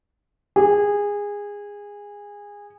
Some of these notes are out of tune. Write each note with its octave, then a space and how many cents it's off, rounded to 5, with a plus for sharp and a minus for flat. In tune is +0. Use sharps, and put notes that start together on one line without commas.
G#4 -20